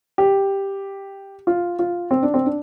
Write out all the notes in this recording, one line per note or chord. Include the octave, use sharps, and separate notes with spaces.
G4
F4
F4
C4
D4
C4
D4